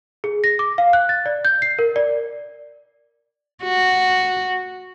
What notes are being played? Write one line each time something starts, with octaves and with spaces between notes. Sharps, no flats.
G#4
A#6
D6
F5
F#6
A6
D5
G6
C7
A#4
D5
F#4